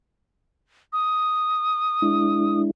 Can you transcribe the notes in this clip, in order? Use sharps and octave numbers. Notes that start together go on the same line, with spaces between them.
D#6
G#3 D4 E4